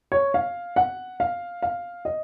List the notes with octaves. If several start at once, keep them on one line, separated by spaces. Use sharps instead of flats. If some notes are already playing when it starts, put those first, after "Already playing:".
C#5
F5
F#5
F5
F5
D#5